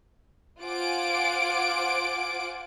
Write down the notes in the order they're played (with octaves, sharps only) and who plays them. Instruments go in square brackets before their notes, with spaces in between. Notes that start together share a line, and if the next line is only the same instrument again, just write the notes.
[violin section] F4 C5 F#5 G#5 D6 D7